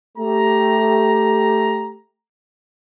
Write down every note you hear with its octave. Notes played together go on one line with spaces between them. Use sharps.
A3 G4 A#5